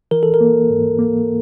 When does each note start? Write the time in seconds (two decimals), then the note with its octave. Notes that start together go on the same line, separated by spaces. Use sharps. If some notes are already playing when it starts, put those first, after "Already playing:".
0.11 E3 A#4
0.23 A4
0.34 A#4
0.40 A#3
0.70 G#2
0.99 A#3